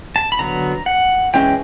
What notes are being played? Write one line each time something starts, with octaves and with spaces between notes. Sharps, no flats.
A5
B5
D3 F#3 B3 A#5
F#5
E3 G#3 C#4 G5